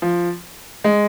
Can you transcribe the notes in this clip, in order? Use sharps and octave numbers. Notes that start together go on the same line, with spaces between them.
F3
G#3